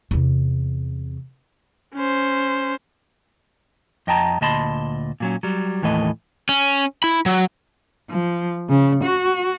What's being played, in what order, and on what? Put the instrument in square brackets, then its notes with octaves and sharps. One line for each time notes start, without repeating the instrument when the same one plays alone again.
[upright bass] E2 C3
[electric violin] C#4 C5
[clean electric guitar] F2 D#5 G5 A5 A#5
D2 A#2 D#5 A5 B5 C6
A#2 F#3 C#4
F#3 G3
D#2 A2 E3 A3 D#5
[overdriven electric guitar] C#4
E4 B5
F#3
[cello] F3
C#3
F#4